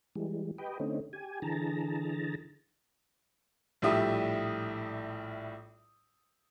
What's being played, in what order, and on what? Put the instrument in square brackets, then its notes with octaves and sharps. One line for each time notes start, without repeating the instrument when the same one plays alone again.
[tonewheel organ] E3 G3 G#3
G4 B4 D#5 G5
D3 A3 C4 C#4 D#4
G4 G#5
D3 E3 G#4 A5 A#5
[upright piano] A#1 A2 G3 G4 E5 D#6